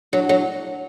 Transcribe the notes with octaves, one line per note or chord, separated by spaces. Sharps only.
F#3 D4
F#3